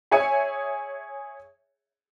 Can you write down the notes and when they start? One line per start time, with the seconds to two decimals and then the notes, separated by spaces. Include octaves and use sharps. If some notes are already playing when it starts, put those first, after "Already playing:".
0.11 G#4 C#5 E5 G#5 C#7